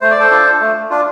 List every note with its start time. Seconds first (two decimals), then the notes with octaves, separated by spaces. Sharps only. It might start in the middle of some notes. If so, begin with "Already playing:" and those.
0.01 A3 C5
0.11 D5
0.19 A4 C5
0.31 D4 F4
0.61 A3
0.90 D4 F4